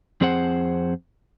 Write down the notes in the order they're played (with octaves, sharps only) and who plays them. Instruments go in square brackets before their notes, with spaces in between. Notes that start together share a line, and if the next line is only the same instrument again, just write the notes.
[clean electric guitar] F2 C4 G#4 C5 F#5